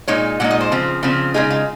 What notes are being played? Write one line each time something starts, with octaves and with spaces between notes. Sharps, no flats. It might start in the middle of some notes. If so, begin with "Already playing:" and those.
A#2 G#3 D#4 C#5
A#2 G#3 D#4 F#5
D#5
C5
C#3 F3 C4
C#3 F3 C4
C#3 G#3 D#4 G#4
F4